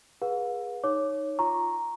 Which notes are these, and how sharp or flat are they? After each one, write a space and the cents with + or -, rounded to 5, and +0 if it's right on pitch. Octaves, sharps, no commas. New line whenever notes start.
G#4 -10 B4 -30 F5 +45
D#4 +0 C#5 +0 D6 +0
F4 +0 A#5 +0 C#6 -15